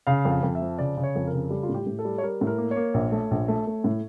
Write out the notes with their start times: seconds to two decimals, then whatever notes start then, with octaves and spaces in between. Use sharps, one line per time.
0.07 C#3 F5
0.25 F2
0.31 F5
0.43 F2
0.55 E5
0.62 F3
0.78 C#3 D5
0.97 C#3
1.03 C#5
1.16 F2
1.27 A#4
1.34 C#3
1.50 G3 A4
1.63 F4
1.69 A2
1.74 G4
1.86 A2
1.99 A4
2.05 G3
2.18 C#5
2.22 G3 A#4
2.41 A2
2.47 A#4
2.58 A#3
2.71 C#5
2.76 A#3
2.94 A#1
3.12 A3
3.31 A#1
3.48 A3
3.67 A3
3.84 A2